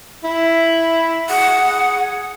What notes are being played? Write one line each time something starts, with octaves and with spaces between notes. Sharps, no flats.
E4
G#4 F#5